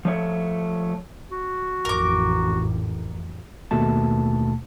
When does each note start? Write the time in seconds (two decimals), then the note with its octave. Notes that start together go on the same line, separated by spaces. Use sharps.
0.05 F3 A3 C#5
1.31 F#4
1.85 A1 F2 A#4 D6
3.71 D#2 B2 A3 A5